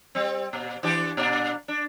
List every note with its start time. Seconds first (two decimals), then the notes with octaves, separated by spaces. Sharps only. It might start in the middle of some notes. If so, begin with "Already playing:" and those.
0.15 G3 C4
0.53 A#2
0.83 E3 D4 G4
1.17 A#2 D4
1.68 D4